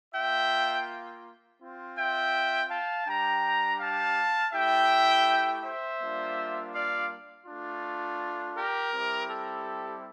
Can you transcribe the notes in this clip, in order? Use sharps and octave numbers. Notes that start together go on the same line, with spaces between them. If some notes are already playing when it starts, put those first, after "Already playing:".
A#3 F4 E5 G5
C4 F4
E5 G5
F5 A5
G3 D4 G4 G5 A#5
F5 A5
A3 E4 G4 E5 G5
C5 E5
G3 A#3 D4 F4
D5 F5
A3 D4 F4
G4 A#4
G3 C4 E4 G4
A4